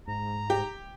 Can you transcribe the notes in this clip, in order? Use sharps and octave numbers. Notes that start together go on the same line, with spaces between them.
G#2 A#5
G4